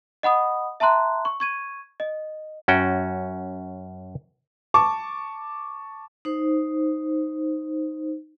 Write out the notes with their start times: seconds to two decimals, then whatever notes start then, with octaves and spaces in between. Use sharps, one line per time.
0.23 D#5 F#5 B5 D#6
0.80 E5 A5 A#5 C6 F#6
1.25 C#6
1.40 C#6 G#6 D#7
2.00 D#5
2.68 F#2 C#4 F#4 G5
4.74 A5 C#6 D6
6.25 D#4 C5